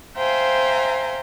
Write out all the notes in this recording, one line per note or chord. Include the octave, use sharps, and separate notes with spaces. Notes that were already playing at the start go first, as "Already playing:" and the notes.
C5 E5 F5 G5 G#5 A#5